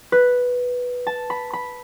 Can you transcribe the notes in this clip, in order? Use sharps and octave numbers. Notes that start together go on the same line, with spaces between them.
B4
A5
B5
B5